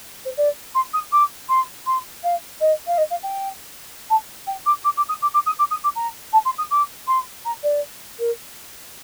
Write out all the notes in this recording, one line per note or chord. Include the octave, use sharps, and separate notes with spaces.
C5
D5
C6
D#6
D6
C6
C6
F5
D#5
F5
D#5
F5
G5
A5
G5
D6
D6
D6
D#6
D6
D6
D#6
D6
D#6
D6
A#5
A5
C6
D#6
D6
C6
A#5
D5
A#4